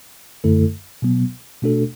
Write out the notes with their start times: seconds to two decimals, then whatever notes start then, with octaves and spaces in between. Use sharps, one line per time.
0.44 F#2 D3 A3 E4 A4
1.02 B2 F#3 B3
1.62 B2 A3 D4 F#4 A4